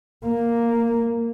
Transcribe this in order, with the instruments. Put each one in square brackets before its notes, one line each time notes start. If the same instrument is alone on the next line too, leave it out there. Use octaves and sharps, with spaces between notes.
[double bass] A#3